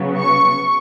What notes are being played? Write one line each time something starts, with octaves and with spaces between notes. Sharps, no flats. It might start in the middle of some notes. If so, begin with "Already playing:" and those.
Already playing: C#3 F#3 B3
C#6